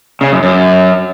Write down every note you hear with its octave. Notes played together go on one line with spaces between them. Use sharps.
C#3
F#2
F#2